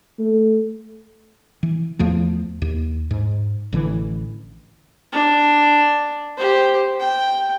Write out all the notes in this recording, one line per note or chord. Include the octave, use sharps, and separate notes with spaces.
A3
E3
E2 F3 A3
D#2
G#2
A1 D3 E3
D4
G4 C5
G5